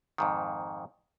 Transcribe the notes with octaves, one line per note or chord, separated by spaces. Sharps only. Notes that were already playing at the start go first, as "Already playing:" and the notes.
F2 G#2 D#3